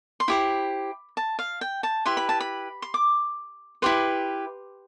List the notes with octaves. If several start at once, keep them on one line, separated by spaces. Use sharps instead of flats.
C6
E4 G4 C5 B5
A5
F5
G5
A5
E4 G4 B4 C6
B5
A5
B5
C6
D6
E4 G4 B4 C6